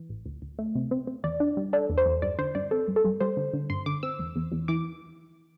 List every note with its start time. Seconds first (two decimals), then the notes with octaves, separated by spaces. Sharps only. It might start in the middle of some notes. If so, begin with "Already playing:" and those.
Already playing: E3
0.09 A1
0.26 D2
0.42 D2
0.59 A3
0.75 C3
0.91 C4
1.07 C4
1.24 E2 D5
1.40 D4
1.57 G3
1.73 D4 A4
1.90 E2
1.98 C5
2.06 E2
2.22 G2 D5
2.39 D3 C5
2.55 G2 D5
2.71 C4 A4
2.88 G2
2.96 A4
3.04 G2
3.20 G3 C5
3.37 D3
3.54 D3
3.70 G2 C6
3.86 D3 D6
4.03 C4 E6
4.19 E2
4.36 E2
4.52 E2
4.68 E3 D6